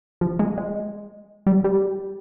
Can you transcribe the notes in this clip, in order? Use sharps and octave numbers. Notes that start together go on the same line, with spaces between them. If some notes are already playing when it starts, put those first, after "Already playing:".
F3
G#3
G#3
G3
G3